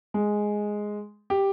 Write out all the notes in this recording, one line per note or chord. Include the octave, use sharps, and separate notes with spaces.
G#3
G4